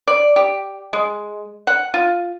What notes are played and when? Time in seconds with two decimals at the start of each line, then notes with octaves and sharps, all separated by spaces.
0.07 D5
0.36 G4
0.93 G#3
1.67 F#5
1.94 F4